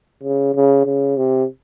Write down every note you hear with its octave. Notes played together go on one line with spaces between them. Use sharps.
C#3
C#3
C#3
C3